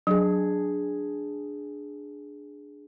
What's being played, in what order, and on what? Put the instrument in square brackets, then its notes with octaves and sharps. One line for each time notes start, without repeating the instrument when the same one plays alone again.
[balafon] F#3 [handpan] D4 G#4